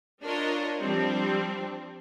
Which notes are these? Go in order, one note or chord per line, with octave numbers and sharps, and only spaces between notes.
D4 F4 A#4 C#5 D#5
F3 G3 C4 D4